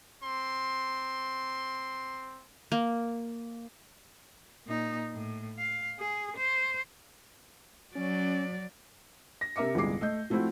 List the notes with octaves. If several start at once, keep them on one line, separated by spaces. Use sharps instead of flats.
C4 C6
A#3
A#2 D#4
A2
F5
G#4
C5
F#3 C#4 D5
A#6
C3 A#4 E5 D6 C#7
G1 C2 G#3 G#4 D6 C7
A3 D#5 G6
F3 A3 C4 E4 F#4